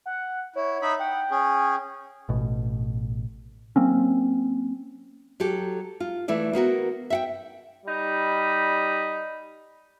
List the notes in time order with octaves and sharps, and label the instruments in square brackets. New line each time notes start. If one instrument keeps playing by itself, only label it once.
[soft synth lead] F#5
[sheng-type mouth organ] E4 [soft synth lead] C#5
[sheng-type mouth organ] D#4 E5 B5
[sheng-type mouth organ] F#5 [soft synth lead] G5
[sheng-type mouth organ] C#4 G#4
[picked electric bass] A1 B2
F#3 A#3 C4 C#4
[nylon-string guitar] F#3 G4 A4
F4
E3 A3 E4 D5
A#3 B3 F#4 A#4
E5 F#5 G5
[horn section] G3 D#4 B5